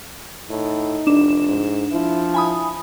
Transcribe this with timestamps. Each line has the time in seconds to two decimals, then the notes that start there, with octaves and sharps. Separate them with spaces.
0.50 A2 D#4
1.07 F1 D4 E7
1.48 G#2
1.91 F3 E4
2.34 E4 G#5 B5 D#6